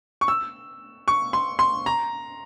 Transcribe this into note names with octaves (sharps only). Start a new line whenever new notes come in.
C#6
E6
C#6
C6
C6
A#5